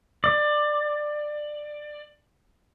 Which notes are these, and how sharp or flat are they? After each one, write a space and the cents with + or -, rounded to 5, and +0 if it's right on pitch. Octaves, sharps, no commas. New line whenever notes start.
D5 +20